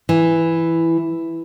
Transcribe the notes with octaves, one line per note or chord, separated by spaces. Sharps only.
E3